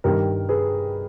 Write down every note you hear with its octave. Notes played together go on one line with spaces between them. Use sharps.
G2 D#3 G3 G4 A#4
G#4 B4